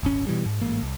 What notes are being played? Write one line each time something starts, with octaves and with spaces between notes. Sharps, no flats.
D#1 G#1 C#4
B2 E3 G3
G#2
A1 G#2 A#3
C2